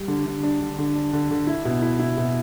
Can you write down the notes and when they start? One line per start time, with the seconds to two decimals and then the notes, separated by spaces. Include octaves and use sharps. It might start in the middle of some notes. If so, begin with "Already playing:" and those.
Already playing: G3
0.08 D3
0.26 D3
0.43 D4
0.61 D3
0.78 D3
0.95 D4
1.13 D3
1.31 D3
1.47 E4
1.65 B2
1.82 E4
2.00 E4
2.18 B2